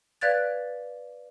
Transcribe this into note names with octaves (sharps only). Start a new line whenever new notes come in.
B4 D5 F5 F#6 G#6 A6